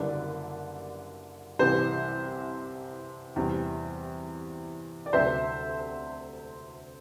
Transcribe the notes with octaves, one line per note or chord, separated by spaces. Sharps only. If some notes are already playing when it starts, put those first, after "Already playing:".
Already playing: F#1 F#2 D3 G3 B4 D5
C2 C3 E3 G3 C5
E2 C3 G3
D5
D2 C3 F#3 C5 E5